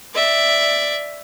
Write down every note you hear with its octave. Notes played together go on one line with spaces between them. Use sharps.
D5 E5